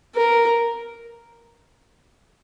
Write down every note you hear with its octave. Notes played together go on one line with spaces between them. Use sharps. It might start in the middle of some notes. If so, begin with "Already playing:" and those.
A#4